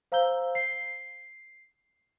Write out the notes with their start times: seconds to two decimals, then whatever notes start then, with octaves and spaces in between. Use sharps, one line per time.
0.12 C5 F5 A#5 E6 G6 G7
0.55 C7